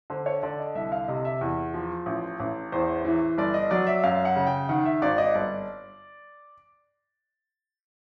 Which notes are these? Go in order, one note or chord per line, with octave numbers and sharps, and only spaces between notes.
D3 C5
C#5
D3 D5
D#5
C2 E5
F5
C3 D#5
E5
E2
F3
A1
A1
E2 C5
E3
G1 D5
D#5
F#3 D5
E5
F#2 F5
F#5
C#3
G5
D#3 F#5
E5
G#1 D5
D#5
G1 D5